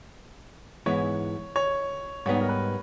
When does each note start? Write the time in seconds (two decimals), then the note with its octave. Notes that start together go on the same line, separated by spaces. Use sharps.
0.86 G#2 E3 G#3 B3 E4 C#5
1.56 C#5
2.26 G#2 G3 B3 D#4 C#5
2.41 A#4
2.49 B4